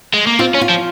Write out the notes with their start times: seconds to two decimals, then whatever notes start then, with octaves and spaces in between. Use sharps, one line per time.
0.14 G#3
0.27 A#3
0.39 C4 F4
0.54 C#4
0.61 F4
0.69 F3